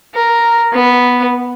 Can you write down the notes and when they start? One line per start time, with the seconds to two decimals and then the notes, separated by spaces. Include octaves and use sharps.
0.15 A#4
0.73 B3